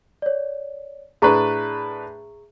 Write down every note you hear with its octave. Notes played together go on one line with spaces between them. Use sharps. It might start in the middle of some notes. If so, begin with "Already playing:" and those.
C#5 D5
A2 D4 G#4 B4 A#5 C#6